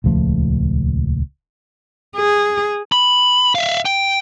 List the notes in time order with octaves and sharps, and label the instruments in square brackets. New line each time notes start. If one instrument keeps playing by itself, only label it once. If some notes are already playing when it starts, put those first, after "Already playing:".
[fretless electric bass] D#1 C#2 F3 A3
[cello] G#4
[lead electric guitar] B5
E5 F5
G5